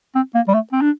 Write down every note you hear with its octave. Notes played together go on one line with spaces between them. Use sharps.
C4
A#3
G3
A3
C4
D4